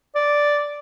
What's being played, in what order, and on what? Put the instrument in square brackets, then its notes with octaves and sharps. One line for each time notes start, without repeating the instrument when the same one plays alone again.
[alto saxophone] D5